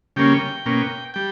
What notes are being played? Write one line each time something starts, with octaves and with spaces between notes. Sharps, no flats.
C#3 G3 A#3 C#4 G5
B2 A#3 C#4
G3 G5